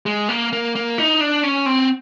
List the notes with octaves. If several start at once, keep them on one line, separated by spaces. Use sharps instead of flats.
G#3
A#3
A#3
A#3
D#4
D4
C#4
C4